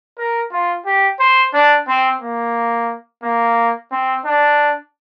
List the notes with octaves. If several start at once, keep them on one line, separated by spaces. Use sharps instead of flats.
A#4
F4
G4
C5
D4
C4
A#3
A#3
C4
D4